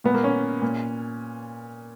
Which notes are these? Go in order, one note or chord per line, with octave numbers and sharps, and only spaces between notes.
A#2 B3
A#3
C#4
A#2